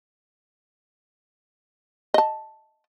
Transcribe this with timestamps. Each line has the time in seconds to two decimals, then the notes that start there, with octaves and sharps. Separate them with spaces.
2.14 D#5 A5